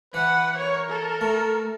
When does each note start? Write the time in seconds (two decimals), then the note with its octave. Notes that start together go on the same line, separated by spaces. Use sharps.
0.14 E3 B4 F#5
0.57 A#4 C#5
0.90 A4
1.21 A3